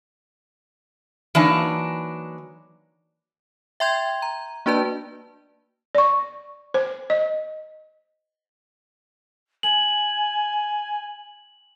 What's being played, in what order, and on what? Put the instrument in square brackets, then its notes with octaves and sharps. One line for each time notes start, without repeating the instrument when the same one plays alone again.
[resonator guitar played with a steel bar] E3 F#3 A#3 D4 D#4
[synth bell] E5 G5 C6 G6 G#6
A#5
A#3 D4 F#4 B4 D5 A5
[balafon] D5 C#6
C5
D#5
[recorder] G#5 [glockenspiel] F#7